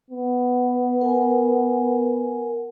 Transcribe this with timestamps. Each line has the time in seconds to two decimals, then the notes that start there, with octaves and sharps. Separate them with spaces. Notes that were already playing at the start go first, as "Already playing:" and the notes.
0.10 B3
1.01 A#4 F#5 G#5